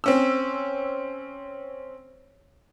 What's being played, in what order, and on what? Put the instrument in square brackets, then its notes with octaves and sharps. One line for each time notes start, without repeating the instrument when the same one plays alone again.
[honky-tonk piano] C4 C#4 E6